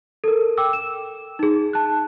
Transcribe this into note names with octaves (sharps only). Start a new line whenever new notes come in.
A4 A#4
G5 D6 E6
E7
D#4 G#4
A5 F#6